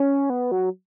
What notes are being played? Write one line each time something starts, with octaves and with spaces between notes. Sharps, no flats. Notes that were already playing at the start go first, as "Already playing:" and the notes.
Already playing: C#4
B3
F#3